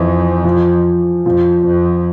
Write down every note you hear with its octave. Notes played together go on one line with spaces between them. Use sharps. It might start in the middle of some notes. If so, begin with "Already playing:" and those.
Already playing: F2 E3
F3
F2 F3
F2